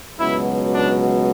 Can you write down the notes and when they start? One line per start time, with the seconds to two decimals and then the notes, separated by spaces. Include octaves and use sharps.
0.19 C#2 B2 F#3 E4
0.73 D4